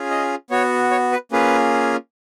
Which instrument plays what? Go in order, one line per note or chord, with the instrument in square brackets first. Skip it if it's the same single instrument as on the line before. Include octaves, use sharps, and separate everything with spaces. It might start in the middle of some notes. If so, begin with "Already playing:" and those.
Already playing: [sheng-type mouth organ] C#4 F4 G#4
D#5
B3 F#4 C#5
C#5
B4
A#3 C#4 F4 G#4 B4